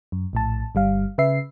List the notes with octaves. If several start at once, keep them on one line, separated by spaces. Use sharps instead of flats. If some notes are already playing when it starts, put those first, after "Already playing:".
F#2
A#1 A2 A5
G1 G3 F5
C#3 B4 E5 C7